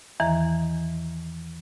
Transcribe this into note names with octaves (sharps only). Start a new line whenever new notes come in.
E2 D#3 E3 A#5